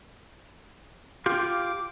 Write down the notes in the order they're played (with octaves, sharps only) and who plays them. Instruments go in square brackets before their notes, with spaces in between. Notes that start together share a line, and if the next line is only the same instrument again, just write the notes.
[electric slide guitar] F4 G4 [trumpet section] D6